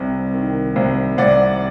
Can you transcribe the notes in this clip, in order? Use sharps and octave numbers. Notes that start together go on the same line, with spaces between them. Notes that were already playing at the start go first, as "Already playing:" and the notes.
Already playing: C2 C3
D#3
C2
C2 D5 F#5